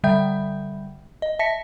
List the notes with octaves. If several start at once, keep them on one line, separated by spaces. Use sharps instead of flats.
D3 G3 E5 G5 G6
D#5
E5 A5 A#6 B6 C#7